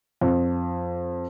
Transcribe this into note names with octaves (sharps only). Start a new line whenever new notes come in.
F2